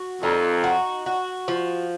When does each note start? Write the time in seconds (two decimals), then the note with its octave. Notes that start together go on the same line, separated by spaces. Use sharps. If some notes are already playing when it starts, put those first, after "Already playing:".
Already playing: F#4
0.22 F2 D#4
0.64 F#4
1.06 F#4
1.48 F3